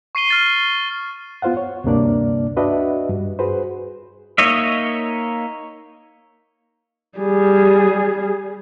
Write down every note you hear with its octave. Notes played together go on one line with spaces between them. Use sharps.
C#6 C7 D#7 G7
F6 A6 C7
G7
B3 F4 C5 F5 F#5
C#5
D2 G2 C3 A#3 D4 D5
D4 F#4 B4 D#5 E5
G2
F#4 G#4 B4 C5
A#3 D#4 C#5 D#5 E5
G3 G#4